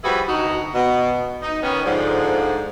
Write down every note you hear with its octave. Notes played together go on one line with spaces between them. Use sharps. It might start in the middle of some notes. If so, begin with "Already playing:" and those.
F3 G3 E4 F#4 G#4 B4
D2 D#4 F#4
B2
D#4
D#3 B3 C#4
G#2 D3 F3